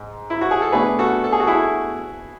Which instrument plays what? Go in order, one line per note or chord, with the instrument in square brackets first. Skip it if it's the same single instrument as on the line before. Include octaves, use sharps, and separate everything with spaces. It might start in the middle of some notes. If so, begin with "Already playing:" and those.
Already playing: [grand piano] G#2 G#3
[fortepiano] E4
F#4
G#4
A4
[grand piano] B2 A3 D4 [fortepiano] G#4 B4
[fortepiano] F#4 A4
A4
G#4
F#4
E4 G#4